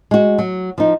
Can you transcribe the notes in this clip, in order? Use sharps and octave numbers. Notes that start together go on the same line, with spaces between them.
G#3 F#4
F#3
F3 D#4